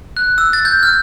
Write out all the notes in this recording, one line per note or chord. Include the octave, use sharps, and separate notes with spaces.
F#6
E6
A6
G6
F6